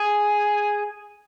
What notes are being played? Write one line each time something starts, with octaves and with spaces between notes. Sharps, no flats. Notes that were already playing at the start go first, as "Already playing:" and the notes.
Already playing: G#4